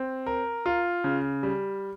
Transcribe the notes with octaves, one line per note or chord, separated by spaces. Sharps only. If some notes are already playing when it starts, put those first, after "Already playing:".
Already playing: C4
A#4
F4
C#3
G3